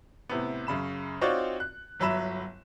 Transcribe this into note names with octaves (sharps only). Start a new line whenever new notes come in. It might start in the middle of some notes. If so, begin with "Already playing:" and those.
A2 C3 B3
F#2 C#3 B5 E7
C4 D#4 F4 F#4 C#5 D5
F#6
G1 F#3 E5 B5 E7